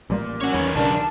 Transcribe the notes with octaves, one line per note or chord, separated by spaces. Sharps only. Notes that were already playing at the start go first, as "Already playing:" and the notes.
A1 A#2 G3 A#3
C#4 F#4 C#5
E2 D#3 B4
B1 C#3 G3 D4 A#4 A5